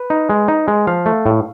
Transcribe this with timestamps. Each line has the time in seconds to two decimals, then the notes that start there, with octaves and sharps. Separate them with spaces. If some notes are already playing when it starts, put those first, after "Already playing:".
Already playing: B4
0.10 D#4
0.30 G#3
0.48 D#4
0.68 G#3
0.87 F3 F5
1.06 A3
1.26 A2